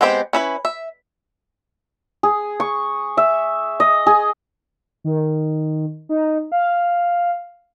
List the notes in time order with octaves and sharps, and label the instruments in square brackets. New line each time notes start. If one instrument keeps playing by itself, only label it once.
[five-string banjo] G#3 B3 C4 G4 C5
C#4 E4 B4
E5
[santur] G#4
C#6
E5
D#5
G#4
[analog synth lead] D#3
D#4
F5